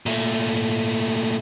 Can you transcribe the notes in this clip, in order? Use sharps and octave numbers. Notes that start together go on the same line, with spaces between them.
A#2 A3